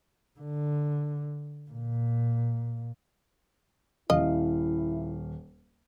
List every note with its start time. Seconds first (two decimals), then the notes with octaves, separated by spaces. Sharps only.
0.40 D3
1.70 A#2
4.10 D#1 E4 D#5 F5